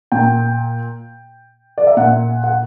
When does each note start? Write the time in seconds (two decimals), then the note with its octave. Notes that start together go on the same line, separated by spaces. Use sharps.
0.12 A#2 G5
1.78 D5
1.87 E5
1.97 A#2 F#5
2.44 F#5